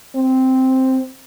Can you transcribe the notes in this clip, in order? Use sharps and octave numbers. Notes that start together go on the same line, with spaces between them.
C4